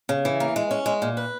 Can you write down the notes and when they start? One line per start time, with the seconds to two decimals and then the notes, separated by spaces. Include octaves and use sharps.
0.09 C#3
0.25 E3
0.40 A#3
0.56 G#3
0.71 C#4
0.86 G#3
1.02 A#2
1.17 B4